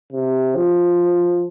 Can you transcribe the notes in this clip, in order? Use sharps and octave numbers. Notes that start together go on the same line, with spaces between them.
C3
F3